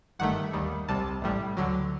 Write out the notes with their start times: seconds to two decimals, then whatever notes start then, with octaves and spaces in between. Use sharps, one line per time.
0.19 G1 G2 D#3 A3 F#5
0.53 D#2 D#3 G3
0.88 C2 C3 G3 A5
1.22 A1 A2 G3
1.57 D2 D3 F#3